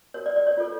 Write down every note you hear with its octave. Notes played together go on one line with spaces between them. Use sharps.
F#4 A#4 C#5
D5
D5
C#5
F4 A4 C#5